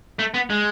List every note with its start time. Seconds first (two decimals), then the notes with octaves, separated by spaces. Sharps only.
0.19 A3
0.34 B3
0.50 G#3